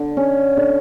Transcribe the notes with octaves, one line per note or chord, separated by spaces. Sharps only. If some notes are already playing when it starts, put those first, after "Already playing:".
Already playing: D3
C#4
D3